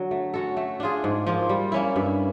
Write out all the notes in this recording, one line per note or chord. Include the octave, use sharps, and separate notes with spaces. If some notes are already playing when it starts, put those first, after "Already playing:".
Already playing: D3 F#3
A3
C#4 F#4 A4
A3
D4 F4 G#4
G#2
F3 A#3
G3
A#3 C#4 E4
G2